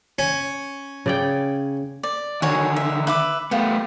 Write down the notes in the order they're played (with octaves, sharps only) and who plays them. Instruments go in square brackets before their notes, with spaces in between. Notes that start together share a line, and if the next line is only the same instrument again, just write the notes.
[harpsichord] C#4
[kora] C#3 D5 G5
[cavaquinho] D5
[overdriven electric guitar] D3 D#3 [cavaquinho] F#4 C#5 G#5
[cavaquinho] E5
B4 E5 D6
[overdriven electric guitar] A3 B3 [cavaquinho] F4 G4